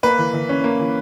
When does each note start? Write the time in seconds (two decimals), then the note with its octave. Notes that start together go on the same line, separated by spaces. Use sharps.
0.03 A#3 B4
0.19 E3
0.34 E3
0.49 C#4
0.64 A#3
0.80 E3